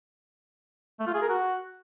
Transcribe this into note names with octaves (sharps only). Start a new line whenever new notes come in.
A3
F4
G#4
A#4
F#4